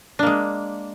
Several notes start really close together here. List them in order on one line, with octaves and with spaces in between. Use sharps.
D4 A#3 G#3